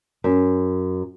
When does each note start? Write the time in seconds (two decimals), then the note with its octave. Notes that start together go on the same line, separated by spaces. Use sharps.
0.24 F#2